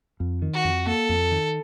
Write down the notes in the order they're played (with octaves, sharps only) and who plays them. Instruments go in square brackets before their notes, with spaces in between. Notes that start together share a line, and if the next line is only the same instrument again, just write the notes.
[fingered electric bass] F2
D#3
[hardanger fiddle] F#4
[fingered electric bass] F2
[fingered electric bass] A#3 [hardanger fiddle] A4
[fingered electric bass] F2
D#3